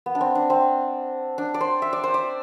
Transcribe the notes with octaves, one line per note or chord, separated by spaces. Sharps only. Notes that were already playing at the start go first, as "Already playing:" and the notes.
B3
D4
C4
D4
C4
D4
D5
C5
E5
D5
C5
D5